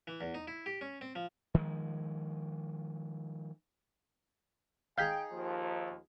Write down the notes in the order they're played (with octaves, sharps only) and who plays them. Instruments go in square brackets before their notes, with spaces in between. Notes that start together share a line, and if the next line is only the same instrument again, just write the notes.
[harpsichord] E3
E2
D#4
E4
G4
C#4
C4
F3
[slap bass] D#3 F3 G#3
[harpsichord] D#4 G#4 G#5 [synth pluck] F5 G6 B6 [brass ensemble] G5
[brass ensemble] D#2 F3